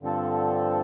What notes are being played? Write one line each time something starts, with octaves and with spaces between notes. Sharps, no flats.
G2 D3 F3 C4 A4